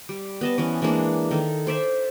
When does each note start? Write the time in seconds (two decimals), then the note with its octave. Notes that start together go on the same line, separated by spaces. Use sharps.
0.09 G3
0.41 B3 D#5 A5
0.58 E3 C#4
0.82 E3 G#3 A#3 D4
1.31 D#3 A4
1.67 C5 D5 E5